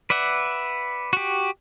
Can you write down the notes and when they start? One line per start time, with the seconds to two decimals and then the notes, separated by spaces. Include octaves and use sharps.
0.10 B4 D5 E5 F#5
1.13 F#4 G4